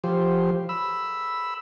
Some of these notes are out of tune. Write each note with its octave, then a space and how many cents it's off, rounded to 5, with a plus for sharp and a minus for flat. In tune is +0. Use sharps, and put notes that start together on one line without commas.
F3 -5 G4 -5 C5 +5
B5 +0 E6 +0